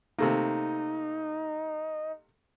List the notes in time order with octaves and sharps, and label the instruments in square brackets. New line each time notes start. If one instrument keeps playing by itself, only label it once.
[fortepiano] C3 A3 A#3 [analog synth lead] D#4